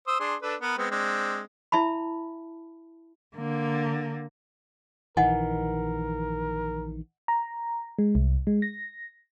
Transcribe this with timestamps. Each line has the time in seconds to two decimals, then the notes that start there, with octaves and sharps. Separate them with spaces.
0.07 C5 D#6 E6
0.20 D4 G#4 C6
0.42 D4 A4 B4
0.61 B3 A#4 B4
0.78 G#3 B3 C4
0.91 G#3 C4 D4
1.72 E4 E5 A5 B5
3.37 D3 A#3
5.17 A#1 D#3 E3 A#4 D#5 F#5 G#5
7.28 A#5
7.99 G#3
8.15 C2
8.47 G#3
8.62 A#6